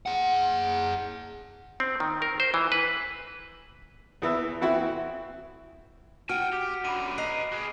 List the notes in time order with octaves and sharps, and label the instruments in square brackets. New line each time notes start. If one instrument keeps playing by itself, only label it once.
[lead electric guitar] G#4 F#5
[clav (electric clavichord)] C4
D#3
A#4
C5
E3
B4
[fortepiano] E2 E3 E5
E3 C4 E4 F#4
[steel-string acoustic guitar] F#4 [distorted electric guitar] G5 G#5 [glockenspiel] F6
[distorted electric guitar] G4
[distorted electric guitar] F#2 D3 [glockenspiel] B5 D6 D#7
[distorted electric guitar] B4 A#5 [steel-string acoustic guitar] D#5 [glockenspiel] C7
[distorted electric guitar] F#4 G#4